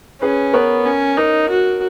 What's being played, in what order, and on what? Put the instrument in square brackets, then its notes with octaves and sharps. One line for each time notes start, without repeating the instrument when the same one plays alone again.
[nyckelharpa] C#4 [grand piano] G#4 B4
[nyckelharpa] B3 [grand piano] A#4 C#5
[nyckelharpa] C#4
[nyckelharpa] D#4 [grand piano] A#4
[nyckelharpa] F#4